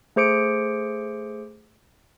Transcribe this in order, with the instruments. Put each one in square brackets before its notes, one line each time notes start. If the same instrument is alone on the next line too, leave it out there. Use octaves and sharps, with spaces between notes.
[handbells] A3 G#4 C5 D6 C#7 D7